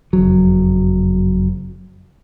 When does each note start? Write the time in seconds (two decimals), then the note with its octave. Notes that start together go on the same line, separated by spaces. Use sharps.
0.13 F#1 F2 F#3